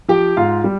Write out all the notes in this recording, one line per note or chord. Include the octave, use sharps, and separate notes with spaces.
F3 G4 G5
G#2 F4 F5
G3